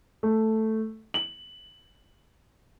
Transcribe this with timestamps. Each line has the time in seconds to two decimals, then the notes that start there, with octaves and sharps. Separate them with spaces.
0.23 A3
1.14 F#7